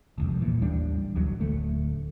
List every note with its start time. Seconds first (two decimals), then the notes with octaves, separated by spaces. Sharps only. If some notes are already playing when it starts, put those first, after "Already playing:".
0.18 E1 C2 F2
0.41 A#2 E3
0.62 A1 D#2 G3 D4
1.16 A1 D2 F#3
1.40 D1 D2 A3